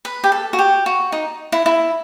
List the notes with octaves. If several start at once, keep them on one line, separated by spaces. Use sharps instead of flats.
B4
G4
A4
F#4
G4
F#4
D#4
E4
E4